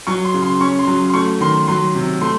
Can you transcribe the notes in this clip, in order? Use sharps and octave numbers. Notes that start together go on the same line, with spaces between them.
F#3 C#6
C6
C#3
C6
C#4 C#6
C6
F#3
C6
A3 C#6
D#3 C6
F#3 C6
C3
A3 C6